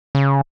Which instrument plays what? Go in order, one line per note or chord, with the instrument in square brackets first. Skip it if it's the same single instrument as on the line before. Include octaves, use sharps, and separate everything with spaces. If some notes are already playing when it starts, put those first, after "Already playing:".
[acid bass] C#3